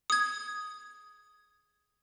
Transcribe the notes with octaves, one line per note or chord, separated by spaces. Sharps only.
D#6 G#6